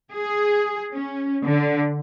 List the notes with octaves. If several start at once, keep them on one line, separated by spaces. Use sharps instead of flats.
G#4
C#4
D3